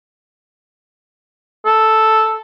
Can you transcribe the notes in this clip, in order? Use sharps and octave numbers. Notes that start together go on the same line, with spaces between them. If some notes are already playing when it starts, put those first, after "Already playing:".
A4